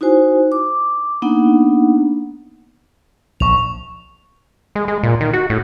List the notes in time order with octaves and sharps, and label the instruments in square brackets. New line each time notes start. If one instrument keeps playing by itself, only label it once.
[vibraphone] D#4 E4 F#4 C5 G#5
D6
A#3 B3 D4 D#4 F#5
[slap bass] A#1 [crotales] C#6 F7
[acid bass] G#3
G#3
A#2
D#3
F#4
A2